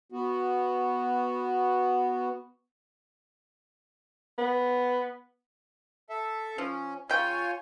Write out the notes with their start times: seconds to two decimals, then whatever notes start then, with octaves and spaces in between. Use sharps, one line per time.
0.12 B3 F#4
4.38 B3
6.10 A4 E5
6.58 F3 C#4
7.10 C#3 F4 C#5 G5 G#5